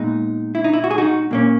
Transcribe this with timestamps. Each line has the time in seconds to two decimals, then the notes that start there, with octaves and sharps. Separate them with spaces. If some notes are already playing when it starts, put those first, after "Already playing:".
Already playing: A#2 G#3 B3 D#4
0.55 E4
0.64 D#4
0.73 E4
0.84 F#4
0.91 G#4
0.98 D#4 F#4
1.31 A#2 A#3 C#4